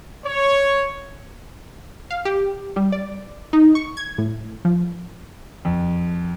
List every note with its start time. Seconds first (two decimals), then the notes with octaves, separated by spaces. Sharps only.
0.25 C#5
2.10 F5
2.25 G4
2.76 G3
2.92 D5
3.53 D#4
3.75 C#6
3.97 G#6
4.18 A2
4.65 F3
5.65 F2